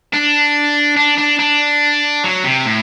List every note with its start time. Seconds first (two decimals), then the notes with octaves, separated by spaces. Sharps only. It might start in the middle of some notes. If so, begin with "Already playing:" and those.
0.13 D4
0.97 D4
1.18 D4
1.39 D4
2.24 F#3
2.44 C3
2.65 A2